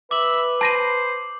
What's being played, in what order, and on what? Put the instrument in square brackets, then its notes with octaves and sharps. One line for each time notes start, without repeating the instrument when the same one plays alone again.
[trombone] B4 [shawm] E5 [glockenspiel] D6 F#7
[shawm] C5 [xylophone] A5 A#6 D#7